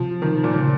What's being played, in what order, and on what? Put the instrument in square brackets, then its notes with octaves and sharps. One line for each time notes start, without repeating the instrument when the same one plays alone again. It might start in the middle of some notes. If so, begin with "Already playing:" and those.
Already playing: [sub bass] C3 [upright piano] F3
[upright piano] D#3
A#2
[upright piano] A#2 [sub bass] C#3